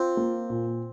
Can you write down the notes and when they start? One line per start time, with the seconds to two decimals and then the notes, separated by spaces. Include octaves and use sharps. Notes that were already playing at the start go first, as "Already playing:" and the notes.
Already playing: C4 F4
0.17 A#3
0.50 A#2